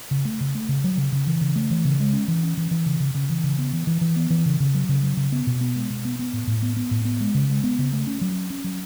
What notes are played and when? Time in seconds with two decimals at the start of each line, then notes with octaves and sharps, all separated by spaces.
0.11 C#3
0.25 A3
0.41 C#3
0.55 A3
0.69 C#3
0.84 F#3
0.97 C#3
1.12 C#3
1.27 E3
1.41 C#3
1.55 A3
1.70 E3
1.85 C#3
2.00 G#3
2.13 C#4
2.28 E3
2.43 C#4
2.57 E3
2.71 E3
2.86 C#3
3.00 C#3
3.15 C#3
3.30 E3
3.44 C#3
3.59 B3
3.73 E3
3.87 E3
4.01 E3
4.16 B3
4.30 E3
4.46 C#3
4.60 C#3
4.74 F#3
4.89 C#3
5.03 F#3
5.17 C#3
5.32 B3
5.47 B2
5.61 B3
5.76 G#3
5.90 B2
6.05 B3
6.19 B3
6.33 A2
6.47 A2
6.62 B3
6.76 B3
6.91 A2
7.05 B3
7.21 G#3
7.35 C#3
7.49 G#3
7.63 B3
7.79 C#3
7.93 A3
8.07 C#4
8.21 F#3
8.35 C#4
8.50 C#4
8.64 F#3